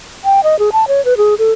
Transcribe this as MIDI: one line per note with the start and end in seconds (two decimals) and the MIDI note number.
0.24 0.40 79
0.43 0.58 75
0.59 0.70 68
0.72 0.88 81
0.88 1.03 73
1.05 1.17 71
1.17 1.34 68
1.38 1.52 69